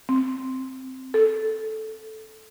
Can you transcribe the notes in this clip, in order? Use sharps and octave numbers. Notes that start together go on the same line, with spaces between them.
C4
A4